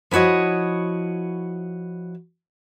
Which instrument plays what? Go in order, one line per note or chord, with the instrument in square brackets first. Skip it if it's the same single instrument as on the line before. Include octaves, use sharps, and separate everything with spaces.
[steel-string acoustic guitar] F3 E4 F#4 C#5 D#5